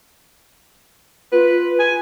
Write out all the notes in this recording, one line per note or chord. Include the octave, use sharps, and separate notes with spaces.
F4 B4
G#5